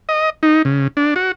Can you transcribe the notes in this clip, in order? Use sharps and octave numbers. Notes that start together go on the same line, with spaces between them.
D#5
D#4
C#3
D4
F#4